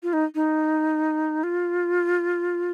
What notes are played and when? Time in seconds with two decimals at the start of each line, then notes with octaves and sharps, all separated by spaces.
0.03 F4
0.13 D#4
0.35 D#4
1.43 F4